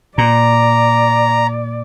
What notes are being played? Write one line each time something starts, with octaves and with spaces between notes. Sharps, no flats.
A#2 D5 A#5